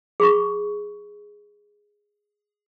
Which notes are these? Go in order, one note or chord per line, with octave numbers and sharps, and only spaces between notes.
G#4 B5 C#6